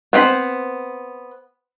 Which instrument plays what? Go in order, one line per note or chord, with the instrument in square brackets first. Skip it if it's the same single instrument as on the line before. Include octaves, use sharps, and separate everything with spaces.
[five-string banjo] B3 C4 D5 B5